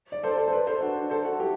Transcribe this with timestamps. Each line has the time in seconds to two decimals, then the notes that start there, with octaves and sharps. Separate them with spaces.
0.12 D5
0.23 A4 C5
0.31 D5
0.38 A4 C5
0.48 C5
0.52 B4 D5
0.67 A4 C5
0.81 D4 F#4
1.10 A4 C5
1.25 F#4 A4
1.40 E4 G4